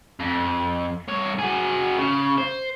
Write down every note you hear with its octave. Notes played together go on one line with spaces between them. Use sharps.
F2
G2 C#5
F#4 G#4
C#3
C5